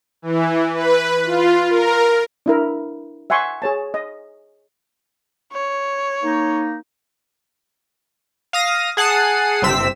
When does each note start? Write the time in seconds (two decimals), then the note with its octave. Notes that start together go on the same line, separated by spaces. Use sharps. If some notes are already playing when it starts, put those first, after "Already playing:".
0.22 E3
0.74 B4
1.26 F4
1.69 A#4
2.46 D4 E4 A#4
3.30 E5 F#5 G#5 C6 C#6
3.62 G#4 C#5 A5
3.94 D#5
5.52 C#5
6.22 A#3 D#4
8.53 F5 D#6 A#6
8.97 G#4 F#5 A5 C7 D#7
9.62 G1 C3 C4 E6 B6